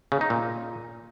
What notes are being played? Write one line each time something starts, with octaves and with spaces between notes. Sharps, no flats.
C#3
D#4
A#2